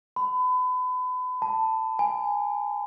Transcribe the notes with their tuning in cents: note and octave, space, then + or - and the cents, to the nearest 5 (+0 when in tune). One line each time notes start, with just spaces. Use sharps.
B5 +30
A5 +10
G#5 -15